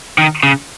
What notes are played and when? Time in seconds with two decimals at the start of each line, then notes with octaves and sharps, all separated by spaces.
0.18 D#3
0.43 C#3